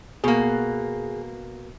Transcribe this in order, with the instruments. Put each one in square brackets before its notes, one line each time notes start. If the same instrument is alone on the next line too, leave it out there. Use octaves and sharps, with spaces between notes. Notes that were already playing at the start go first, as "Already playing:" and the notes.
[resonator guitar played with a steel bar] B2 A#3 [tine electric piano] G#4